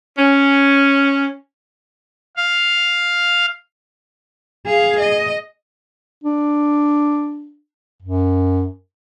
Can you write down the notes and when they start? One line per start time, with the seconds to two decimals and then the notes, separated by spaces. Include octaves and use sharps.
0.19 C#4
2.37 F5
4.66 G#4 F5
4.99 D#5
6.24 D4
8.02 F#2